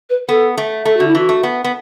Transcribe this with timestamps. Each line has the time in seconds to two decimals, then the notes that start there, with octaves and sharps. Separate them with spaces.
0.10 B4
0.29 B3 A4
0.58 A3
0.85 A3 A4
0.97 D3 F#4
1.07 E4
1.15 E3 F#4
1.29 A3
1.43 B3
1.64 B3